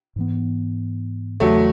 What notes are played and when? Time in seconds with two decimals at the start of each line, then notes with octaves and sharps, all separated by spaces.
0.16 G#2 E3 B3
1.40 E2 C#3 E3 F#3 A3